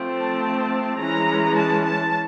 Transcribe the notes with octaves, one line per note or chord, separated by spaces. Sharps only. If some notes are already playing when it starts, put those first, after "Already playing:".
Already playing: F3 A3 C4
A5
E3 G#3 C#4 A#5
A5
A5